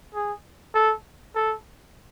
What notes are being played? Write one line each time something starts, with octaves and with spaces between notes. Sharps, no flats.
G#4
A4
A4